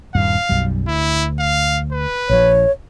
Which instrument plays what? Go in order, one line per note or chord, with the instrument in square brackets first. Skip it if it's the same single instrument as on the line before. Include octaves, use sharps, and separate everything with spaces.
[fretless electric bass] D#1 G2 [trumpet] F5
[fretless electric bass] B1 F#2 G3
[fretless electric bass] D2 [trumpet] E4
[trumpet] F5
B4
[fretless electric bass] A#1 E3 F3 [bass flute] C#5